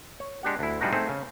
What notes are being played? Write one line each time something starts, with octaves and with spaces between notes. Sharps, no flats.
C#5
G#3 D4 G4 F#5
D2 E4
F3 G3 G#3 D4 D#4 F#4
A3 C4 D#4 G#4 C5
C#3